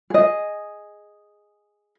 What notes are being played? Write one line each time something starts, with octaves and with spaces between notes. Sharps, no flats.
G#4 D#5